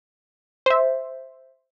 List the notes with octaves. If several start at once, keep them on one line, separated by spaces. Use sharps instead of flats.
C5 E5